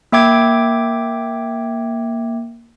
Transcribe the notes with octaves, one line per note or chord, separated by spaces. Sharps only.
A#3 E5 G5 D6 G#6